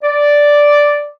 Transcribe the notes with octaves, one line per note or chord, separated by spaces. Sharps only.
D5